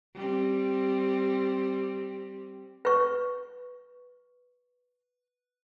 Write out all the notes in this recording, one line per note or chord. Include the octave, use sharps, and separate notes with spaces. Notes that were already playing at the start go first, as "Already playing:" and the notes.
G3 C4
B4 C#6